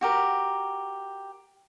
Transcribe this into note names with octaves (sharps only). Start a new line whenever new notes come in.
F#4 G4 A#4